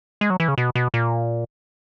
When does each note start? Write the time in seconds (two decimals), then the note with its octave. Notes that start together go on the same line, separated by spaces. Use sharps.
0.21 G#3
0.30 F#3
0.40 E3
0.48 C#3
0.58 B2
0.75 B2
0.94 A#2